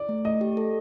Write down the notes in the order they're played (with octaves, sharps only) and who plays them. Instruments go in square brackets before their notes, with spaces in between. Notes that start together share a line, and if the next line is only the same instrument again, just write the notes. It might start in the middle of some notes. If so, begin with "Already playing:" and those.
Already playing: [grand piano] D5
[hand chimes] A3
[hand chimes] A3 [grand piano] D#5
[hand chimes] G4
A4